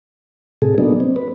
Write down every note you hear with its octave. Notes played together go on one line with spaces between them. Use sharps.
A2 C3 G#4 A4
F#3 A#3 B3 D4 D#4
C4
B4